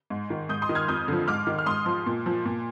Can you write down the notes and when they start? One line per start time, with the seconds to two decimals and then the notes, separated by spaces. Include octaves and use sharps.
0.10 G#2
0.30 D#3
0.49 G#2 D#6 G6
0.62 C6 D#6
0.69 D#3
0.75 F6 G#6
0.88 F2 D#6 G6
1.08 D3 F3
1.28 G#2 D6 F6
1.47 D#3
1.59 F6
1.66 G#2 C6 D#6
1.86 F3
2.06 A#2
2.26 F3
2.45 A#2